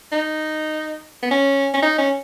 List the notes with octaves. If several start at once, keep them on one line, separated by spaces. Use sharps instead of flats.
D#4
B3
C#4
C#4
D#4
C#4